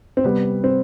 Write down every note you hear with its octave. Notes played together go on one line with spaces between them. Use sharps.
C4
C3 G3 B3
C4